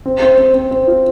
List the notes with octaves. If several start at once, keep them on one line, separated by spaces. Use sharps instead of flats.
C4
C4
C4
C4
C4
F4